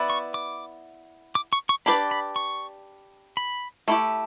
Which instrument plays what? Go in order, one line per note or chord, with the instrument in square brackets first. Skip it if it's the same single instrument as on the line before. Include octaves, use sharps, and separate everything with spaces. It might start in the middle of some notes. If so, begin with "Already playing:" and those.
Already playing: [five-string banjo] B3 E4 B4 D5
[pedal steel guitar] C#6
D6
D6
C#6
C#6
[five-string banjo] D4 G4 B4 D5 [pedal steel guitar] B5
[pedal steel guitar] B5
C#6
B5
[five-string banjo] A3 E4 G4